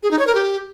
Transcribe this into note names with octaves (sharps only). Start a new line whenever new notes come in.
G#4
D#4
C#5
A#4
G4